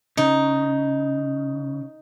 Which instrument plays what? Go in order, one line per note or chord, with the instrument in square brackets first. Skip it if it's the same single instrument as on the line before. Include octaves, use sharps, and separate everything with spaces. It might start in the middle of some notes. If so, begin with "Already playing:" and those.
[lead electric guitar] C#3 [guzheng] D#4